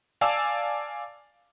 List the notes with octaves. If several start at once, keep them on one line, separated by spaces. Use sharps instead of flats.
D5 F5 G#5 A5 D6 E6